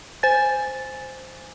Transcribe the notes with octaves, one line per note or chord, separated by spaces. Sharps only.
C5 G#5 A6